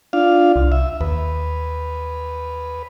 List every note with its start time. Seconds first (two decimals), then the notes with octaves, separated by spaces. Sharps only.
0.13 D4 F4 F5
0.56 C2
0.72 E5
1.01 D#2 B4